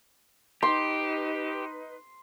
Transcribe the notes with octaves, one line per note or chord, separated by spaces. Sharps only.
D#4 G4 B4 C6